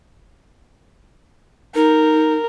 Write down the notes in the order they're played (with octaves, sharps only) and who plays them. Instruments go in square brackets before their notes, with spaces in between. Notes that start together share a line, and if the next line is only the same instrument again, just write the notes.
[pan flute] D#4 [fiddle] A#4